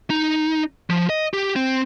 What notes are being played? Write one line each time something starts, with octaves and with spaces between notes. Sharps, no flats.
D#4
F3
D#5
G4
C4